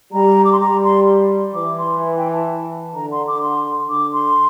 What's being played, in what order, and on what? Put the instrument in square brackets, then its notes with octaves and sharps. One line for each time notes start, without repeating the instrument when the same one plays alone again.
[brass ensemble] G3 [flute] A#5
[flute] D6
C6
[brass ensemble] G3 [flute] A#5
[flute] C6
[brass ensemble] E3 [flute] D6
[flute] C6
G5
A5
[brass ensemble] D3 [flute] A#5
[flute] C6
D6
C6
[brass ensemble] D3 [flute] D6
[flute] C6